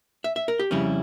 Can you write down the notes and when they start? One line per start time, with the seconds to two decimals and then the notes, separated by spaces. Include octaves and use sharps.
0.24 E5
0.36 E5
0.48 A#4
0.59 G4
0.71 F2 C#3 G3 C#4 E4